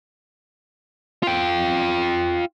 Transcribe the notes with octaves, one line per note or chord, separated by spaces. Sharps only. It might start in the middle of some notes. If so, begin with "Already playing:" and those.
F4 G5